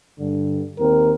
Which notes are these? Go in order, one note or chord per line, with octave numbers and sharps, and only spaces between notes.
G2 D3
D#2 C4 A#4